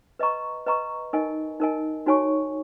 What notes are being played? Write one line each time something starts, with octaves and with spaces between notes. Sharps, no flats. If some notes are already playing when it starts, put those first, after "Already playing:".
B4 D#5 A#5 C#6
B4 D#5 A#5 C#6
D#4 A#4 D#5 G#5
D#4 A#4 D#5 G#5
D#4 F#4 C#5 G#5 C#6